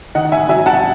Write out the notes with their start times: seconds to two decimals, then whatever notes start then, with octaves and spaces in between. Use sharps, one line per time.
0.15 D#3 D#5 F#5
0.32 E5 G#5
0.49 F#3 E5 G#5
0.66 F#5 A5